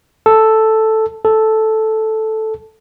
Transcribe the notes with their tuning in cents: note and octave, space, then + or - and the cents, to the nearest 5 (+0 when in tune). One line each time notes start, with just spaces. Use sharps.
A4 +0
A4 -5